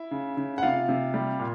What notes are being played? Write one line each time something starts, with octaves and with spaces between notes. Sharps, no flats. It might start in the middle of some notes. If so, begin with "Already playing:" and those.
Already playing: E4 E5
C#3
C#3
F#5
C3 F4 F5
C3
G3
A#2